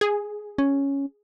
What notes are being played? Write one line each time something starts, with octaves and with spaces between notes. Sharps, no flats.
G#4
C#4